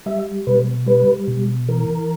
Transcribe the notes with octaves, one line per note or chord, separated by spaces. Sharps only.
G3 E5
B2 B4
G3 B4
B2
E3 A#4